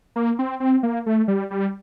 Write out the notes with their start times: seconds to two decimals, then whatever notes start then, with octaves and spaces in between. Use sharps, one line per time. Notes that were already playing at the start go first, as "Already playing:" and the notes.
0.16 A#3
0.39 C4
0.60 C4
0.83 A#3
1.06 A3
1.28 G3
1.51 G3